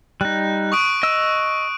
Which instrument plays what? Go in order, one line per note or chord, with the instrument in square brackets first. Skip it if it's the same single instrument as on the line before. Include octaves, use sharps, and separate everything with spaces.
[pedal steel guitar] G3 D#4 [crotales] F#6
[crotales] C#6 D#6 D7
[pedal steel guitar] D#5 E6